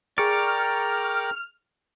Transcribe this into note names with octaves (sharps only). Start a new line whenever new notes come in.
G#4 A#4 D5 G5 A#5 C#6 F6 C#7